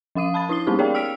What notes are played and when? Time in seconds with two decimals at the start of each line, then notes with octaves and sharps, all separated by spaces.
0.15 F3 C#4 F5 D#6 D#7
0.34 A5 B5 D#6 A6
0.49 D4 E4 D#6 C7 G7
0.67 G3 A#3 B3 C#4 D#4 G4
0.79 G#4 A#4 C#5 D5 F5 G5
0.94 G5 E6 F6 B6 D7 F7